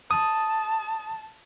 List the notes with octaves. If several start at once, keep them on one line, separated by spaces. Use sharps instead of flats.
A5 D#6